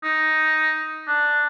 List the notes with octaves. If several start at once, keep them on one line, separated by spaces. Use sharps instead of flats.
D#4
D4